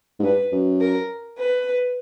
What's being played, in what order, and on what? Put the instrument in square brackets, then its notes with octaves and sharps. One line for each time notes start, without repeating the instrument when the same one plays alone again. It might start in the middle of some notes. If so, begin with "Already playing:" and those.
[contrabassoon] G#2
[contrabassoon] G2 [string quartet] B4
[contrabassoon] F#2
[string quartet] A#4
B4